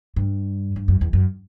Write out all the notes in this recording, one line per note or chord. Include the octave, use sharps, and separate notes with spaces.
G2
G2
F#2
E2
F#2